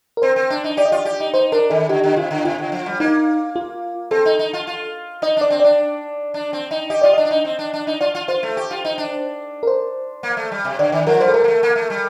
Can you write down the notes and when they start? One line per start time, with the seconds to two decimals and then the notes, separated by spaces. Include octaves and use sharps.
0.17 A#4
0.22 C4 C5
0.36 C4
0.50 D4
0.64 D#4
0.77 G4 D5
0.85 D#5
0.92 F4 D5
1.05 G4
1.20 D#4
1.33 D#4 C5
1.52 D4 A#4
1.70 D#3 A4
1.89 D3 G4
2.03 D3
2.16 C3 F4
2.31 D3
2.45 C3 F4
2.58 D3
2.72 F3
2.86 G3
3.00 A#3 D#4
3.56 F4
4.11 C4 A4
4.26 D#4
4.39 D#4
4.53 F4
4.67 F4
5.22 D#4 D#5
5.37 D4 D5
5.50 C4
5.60 D4 D5
6.34 D4
6.53 C4
6.71 D#4
6.90 G4 D#5
7.02 F4 D5
7.13 D4 D#5
7.25 D4
7.31 D#4
7.45 C4
7.59 D4
7.74 D4
7.87 D#4
8.01 F4 D5
8.15 F4
8.28 F4 C5
8.43 A3
8.57 G4
8.71 F4
8.85 D#4
8.98 D4
9.63 A#4
9.67 C5
10.23 A#3
10.37 A3
10.52 G3
10.65 C3
10.79 D3 D5
10.92 D#3 D5
11.07 F3 A#4
11.21 G3 C5
11.28 A4
11.34 A3 A#4
11.44 A#3
11.48 A3
11.63 A#3
11.76 A3
11.90 G3